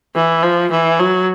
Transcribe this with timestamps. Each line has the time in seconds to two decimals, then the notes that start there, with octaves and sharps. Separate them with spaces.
0.15 E3
0.43 F3
0.71 E3
0.99 F#3